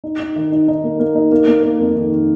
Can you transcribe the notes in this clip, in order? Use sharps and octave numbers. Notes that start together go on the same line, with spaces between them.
D#4
D#4
D#3
D#4
D#4
A#3
A#3
D#4
A#3
A#3
A#3
F2
D#3
D#3